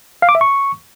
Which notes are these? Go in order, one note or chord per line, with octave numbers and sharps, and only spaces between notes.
F5
D6
E5
C#6